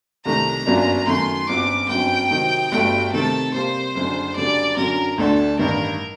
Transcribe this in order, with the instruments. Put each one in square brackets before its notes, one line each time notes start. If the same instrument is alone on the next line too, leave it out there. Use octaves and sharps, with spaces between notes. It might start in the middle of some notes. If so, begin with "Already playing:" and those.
[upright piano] C2 C3 D#3 A3 [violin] A#5
[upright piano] G1 F#2 F#3 A#3 D4
[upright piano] F#2 D#3 A3 [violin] C6
[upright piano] G1 F#2 F#3 C4 F#4 [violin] D6
[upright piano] G1 F#2 F#3 C4 [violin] G5
[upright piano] C3 D#3 F#3 C4 D#4
[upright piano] G1 G2 F#3 A3 [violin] G5
[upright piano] C3 D#3 A3 [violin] A4
[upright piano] C3 G3 A#3 [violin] C5
[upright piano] F#1 F#2 D3
[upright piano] F#1 F#2 D3 G3 [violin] D5
[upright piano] F#2 D3 F#3 [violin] A#4
[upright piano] D2 D3 A3 D4 [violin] A4
[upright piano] A1 G2 D#3 G3 [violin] A#4